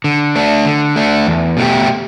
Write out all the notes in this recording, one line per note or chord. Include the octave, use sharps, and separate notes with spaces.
D3
A3 D4
D3
A3 D4
E2
B2 A3 E4 G4